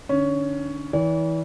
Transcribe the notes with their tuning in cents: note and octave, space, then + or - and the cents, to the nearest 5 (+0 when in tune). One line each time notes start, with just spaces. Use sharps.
D3 +40 C#4 +15
E3 -30 D5 -45